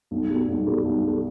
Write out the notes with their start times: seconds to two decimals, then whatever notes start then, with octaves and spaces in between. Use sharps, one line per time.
0.11 B1
0.30 B2 G3
0.48 B1
0.67 B2 G3
0.85 B1
1.03 B2 G3